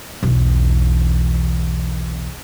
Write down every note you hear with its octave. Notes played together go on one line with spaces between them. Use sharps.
B1 E2